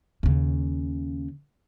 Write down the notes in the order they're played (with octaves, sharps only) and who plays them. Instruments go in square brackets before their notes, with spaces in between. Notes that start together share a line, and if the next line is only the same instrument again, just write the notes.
[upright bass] D#2 C#3